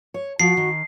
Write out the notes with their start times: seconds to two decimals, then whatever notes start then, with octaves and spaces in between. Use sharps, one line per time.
0.14 C#5
0.40 F3 F#4 C7
0.57 D#3